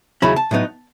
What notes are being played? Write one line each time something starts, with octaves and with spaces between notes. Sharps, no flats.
D#2 C#3 F#3 C#4 E4 B5
A5
A2 F#3 B3 D#4